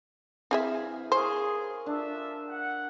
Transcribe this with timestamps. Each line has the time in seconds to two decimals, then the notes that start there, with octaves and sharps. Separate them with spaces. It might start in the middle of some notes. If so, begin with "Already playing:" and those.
0.51 E3 C4 G#4 C5 E5 F5
1.12 G#4 A#4 C5 C#5 F5
1.86 D4 F4 A4 E5
2.48 F#5